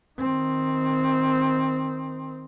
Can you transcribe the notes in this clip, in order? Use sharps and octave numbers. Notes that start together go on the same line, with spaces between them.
D#3 C4